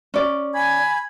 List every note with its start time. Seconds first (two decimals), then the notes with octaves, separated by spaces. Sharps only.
0.14 C#4 D5
0.53 G#5 B5 G#6